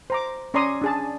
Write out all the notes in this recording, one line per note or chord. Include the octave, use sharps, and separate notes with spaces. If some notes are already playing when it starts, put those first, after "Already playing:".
C5 A#5 D6
C#4 C#5 D5 A#5 C6 D#6
D4 G#4 A5